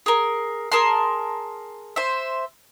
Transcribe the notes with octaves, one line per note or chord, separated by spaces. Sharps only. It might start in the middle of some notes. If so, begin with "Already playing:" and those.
G#4 A#4
G#4 A#4 A5 C6
C5 E5